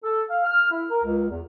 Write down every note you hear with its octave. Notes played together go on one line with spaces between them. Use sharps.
A4
F5
F6
E4
A#4
C#2
E2